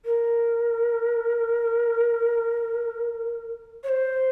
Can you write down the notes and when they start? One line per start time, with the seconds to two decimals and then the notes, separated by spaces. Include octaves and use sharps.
0.05 A#4
3.84 C#5
3.89 C5